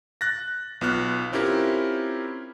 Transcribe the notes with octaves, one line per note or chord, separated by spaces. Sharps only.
F#6 A6 A#6
B1 B3 F4 F6 F#6
C4 C#4 E4 F4 G4 A#4